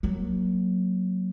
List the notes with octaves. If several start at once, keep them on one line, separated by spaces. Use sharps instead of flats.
F#3 A#3